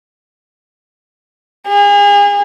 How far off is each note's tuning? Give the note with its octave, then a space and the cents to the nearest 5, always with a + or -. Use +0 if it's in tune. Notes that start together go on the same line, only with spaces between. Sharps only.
G#4 -35